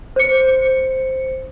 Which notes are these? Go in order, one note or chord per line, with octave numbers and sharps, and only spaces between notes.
C5 C#7